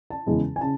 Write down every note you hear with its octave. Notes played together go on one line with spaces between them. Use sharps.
A5
E2 C#3 E3 G#3
G#5
C#3 A5